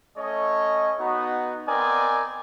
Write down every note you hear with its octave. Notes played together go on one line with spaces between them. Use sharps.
A3 C#4 C#5 D#5
B3 D#4 F#4
B3 C4 A#4 D5 D#5 G#5